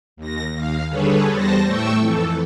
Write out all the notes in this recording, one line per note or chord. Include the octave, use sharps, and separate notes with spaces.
D#2 A#6
D#2 F5
D3 G3 G#4 A4 B4 C#5
E2 G3 C5 A5 A#6
A2 A3 G5 C#6 E6
F2 E3 A4